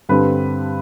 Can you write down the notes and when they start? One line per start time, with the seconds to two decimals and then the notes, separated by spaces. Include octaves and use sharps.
0.09 G2 D3 G3 C4 B4